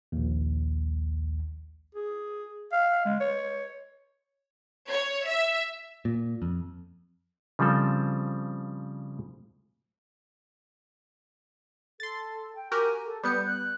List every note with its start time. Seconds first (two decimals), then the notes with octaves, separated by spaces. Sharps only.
0.12 A#1 D#2
1.95 G#4
2.72 F5
3.05 G#3
3.21 C#5
4.90 C#5
5.27 E5
6.05 A#2
6.42 F2
7.59 C#3 F3 G3 C4 A4
12.00 A4 C6 A6
12.55 G5
12.72 F#4 G4 A#4 G#5
13.05 A4
13.23 G3 B3 G6 C#7
13.46 F#6